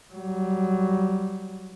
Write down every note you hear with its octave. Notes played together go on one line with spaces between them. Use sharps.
F#3 G3